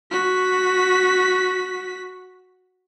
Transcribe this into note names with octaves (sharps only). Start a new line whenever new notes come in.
F#4 B6